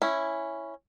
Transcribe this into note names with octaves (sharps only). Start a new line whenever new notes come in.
C#4 E4